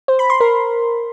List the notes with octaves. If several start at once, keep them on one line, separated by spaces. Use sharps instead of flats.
C5
B5
C6
A#4